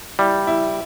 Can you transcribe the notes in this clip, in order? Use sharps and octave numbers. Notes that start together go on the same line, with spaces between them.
G3 E4
E4